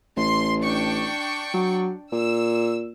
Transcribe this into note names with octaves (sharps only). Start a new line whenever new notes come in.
A1 C6
D4 G5 C#6
F#3
A#2 E6